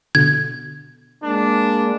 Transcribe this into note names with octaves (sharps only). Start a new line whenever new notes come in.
B2 D3 G#6
G#3 A#3 D4